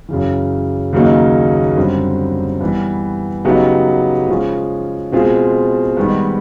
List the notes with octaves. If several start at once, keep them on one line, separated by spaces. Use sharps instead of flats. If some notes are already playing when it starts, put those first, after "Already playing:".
F#2 C#3 E3
D#2 C#3 F#3 A#3 D#4
F#2 D3 G3 C4
E3 G3 B3
C#3 F#3 B3 D#4 G4
C#3 F3 G#3 C#4
B2 G#3 C4 F4 G#4
G#2 D#3 G3 B3